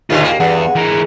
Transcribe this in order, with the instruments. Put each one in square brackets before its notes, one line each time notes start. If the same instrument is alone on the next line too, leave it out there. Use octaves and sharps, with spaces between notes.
[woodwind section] D#2 [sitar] B2 D3 D#3 [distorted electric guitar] F4 G#4
[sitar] A#3
[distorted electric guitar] E2 [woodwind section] G2 F#5 [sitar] G#4
[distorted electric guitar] E3 A#4